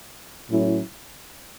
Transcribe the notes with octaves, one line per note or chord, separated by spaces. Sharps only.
A2 F#3 C#4 E4